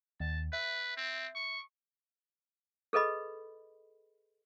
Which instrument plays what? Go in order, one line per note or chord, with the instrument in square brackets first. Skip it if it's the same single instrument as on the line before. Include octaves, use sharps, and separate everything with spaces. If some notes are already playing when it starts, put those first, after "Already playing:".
[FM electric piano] D#2 [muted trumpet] A5
[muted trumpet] B4 [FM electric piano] E5
[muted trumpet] C4
C#6
[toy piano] G#4 A4 B4 D#5 B5